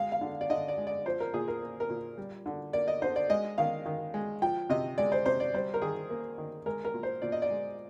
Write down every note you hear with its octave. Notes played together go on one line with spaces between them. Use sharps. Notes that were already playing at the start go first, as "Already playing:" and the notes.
Already playing: G#3 F5
F5
D3
D5
D3 D#5
D5
G#3
D5
F3 C5
A#4
A#2 G#4
A#4
A#3
A#4
A#2
G3
D3
A#3 D5
D#5
D3 C5
D5
G#3 D#5
D#3 F5
D#3
G#3
F3 G5
C3 D#5
G#3 D5
C5
C3 C5
D5
G3 C5
A#4
D#3 G#4
A#3
D#3
G#3 A#4
A#4
A#2
C5
A#2 D5
D#5
D5
G#3